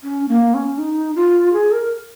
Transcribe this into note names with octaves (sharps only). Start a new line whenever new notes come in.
C#4
A#3
C#4
D#4
F4
G#4
A#4